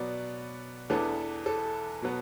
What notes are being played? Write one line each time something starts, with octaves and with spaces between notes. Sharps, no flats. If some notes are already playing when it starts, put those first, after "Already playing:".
Already playing: B2 F#3 B3 D5
E2 E3 B3 D4 A4
A4
B2 F#3 B3